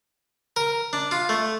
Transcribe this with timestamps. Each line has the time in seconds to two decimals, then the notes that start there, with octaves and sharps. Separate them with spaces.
0.56 A#4
0.93 D4
1.11 F4
1.29 A3